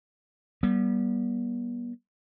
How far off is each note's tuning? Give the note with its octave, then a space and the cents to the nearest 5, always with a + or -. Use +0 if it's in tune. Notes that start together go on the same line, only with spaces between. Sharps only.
G3 -20 B3 -40